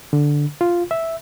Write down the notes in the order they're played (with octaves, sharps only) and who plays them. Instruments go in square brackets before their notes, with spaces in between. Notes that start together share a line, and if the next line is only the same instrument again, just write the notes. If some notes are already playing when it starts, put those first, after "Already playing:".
[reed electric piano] D3
F4
E5